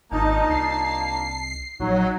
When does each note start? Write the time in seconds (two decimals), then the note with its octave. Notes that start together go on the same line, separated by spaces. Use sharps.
0.12 G#1 A#3 D4 D#4 F4 A5
0.50 C2 C7
1.80 A#1 F#3 D#4